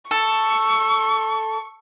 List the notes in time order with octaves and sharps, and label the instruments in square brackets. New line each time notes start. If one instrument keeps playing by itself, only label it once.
[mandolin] A4 [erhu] C#6